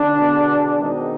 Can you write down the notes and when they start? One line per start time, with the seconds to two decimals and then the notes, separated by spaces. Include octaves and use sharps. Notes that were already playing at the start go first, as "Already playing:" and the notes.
Already playing: D3 D4
0.15 B2 G#3 B3
0.79 B2 D#3 G#3 C4 D#4